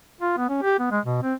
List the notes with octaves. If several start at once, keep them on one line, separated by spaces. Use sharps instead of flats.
F4
B3
C#4
G4
B3
G#3
B2
C4